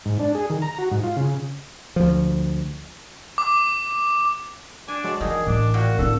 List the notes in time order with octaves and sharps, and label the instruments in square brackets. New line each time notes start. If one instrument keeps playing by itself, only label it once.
[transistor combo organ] G#2
D4
G#4
D#3
A#5
F#4
G#2
F4
C#3
[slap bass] D2 F3
[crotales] D6
[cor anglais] D4 [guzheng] G#5
[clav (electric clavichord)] F#3 G#3 F#4 [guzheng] A4 D5
[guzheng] D#3 [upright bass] E3 [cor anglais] G#4
[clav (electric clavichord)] A1 [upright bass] A2 E3 [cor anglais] D4
[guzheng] A#2 G5 [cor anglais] F#4
[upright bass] D1 E4 [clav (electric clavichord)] D3 [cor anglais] A4